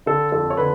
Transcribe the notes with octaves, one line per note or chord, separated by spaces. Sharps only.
D3 A4
F2 A4
C#5
D3 B4